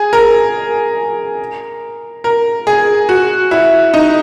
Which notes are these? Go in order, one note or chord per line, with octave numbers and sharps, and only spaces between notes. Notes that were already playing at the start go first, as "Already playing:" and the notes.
Already playing: G#4
A#4
A#4
G#4
F#4
E4
D#4